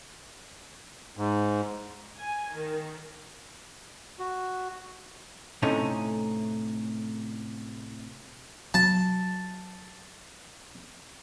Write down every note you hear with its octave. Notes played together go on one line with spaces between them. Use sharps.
G#2
G#5
D#3
F#4
A2 C3 A3 C#4 D#4
F#3 A5